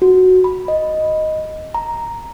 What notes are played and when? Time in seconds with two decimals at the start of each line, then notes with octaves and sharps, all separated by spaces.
0.02 F#4
0.44 B5
0.68 D#5
1.74 A#5